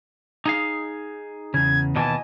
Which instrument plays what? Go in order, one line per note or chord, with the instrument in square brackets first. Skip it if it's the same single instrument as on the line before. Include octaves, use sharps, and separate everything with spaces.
[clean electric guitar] D#4 G#4 F5
[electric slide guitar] E2 C#3 [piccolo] G#6
[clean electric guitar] D#2 B2 E3 [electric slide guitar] D#5 G#5 [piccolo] A5